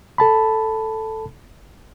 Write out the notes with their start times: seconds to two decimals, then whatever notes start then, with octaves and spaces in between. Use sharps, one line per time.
0.18 A4 A5 B5